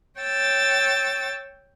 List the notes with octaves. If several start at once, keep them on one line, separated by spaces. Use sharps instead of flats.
C#5 G5 E6 A6